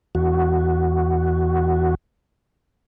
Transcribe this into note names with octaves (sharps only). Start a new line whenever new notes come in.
E2 F#4